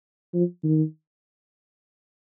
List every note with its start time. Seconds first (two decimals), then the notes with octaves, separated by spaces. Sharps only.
0.34 F3
0.64 D#3